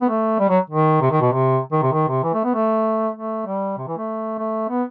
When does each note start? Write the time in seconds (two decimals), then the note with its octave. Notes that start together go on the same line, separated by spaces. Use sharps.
0.02 B3
0.09 A3
0.40 G3
0.49 F#3
0.70 D#3
1.01 C3
1.11 D#3
1.21 B2
1.32 C3
1.72 D#3
1.82 C3
1.93 D#3
2.09 C3
2.23 E3
2.34 A3
2.44 B3
2.54 A3
3.16 A3
3.46 G3
3.77 C3
3.87 E3
3.97 A3
4.38 A3
4.69 B3